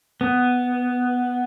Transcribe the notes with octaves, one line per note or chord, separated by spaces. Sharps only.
B3